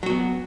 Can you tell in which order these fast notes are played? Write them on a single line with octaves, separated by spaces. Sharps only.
F#3 F#4 B3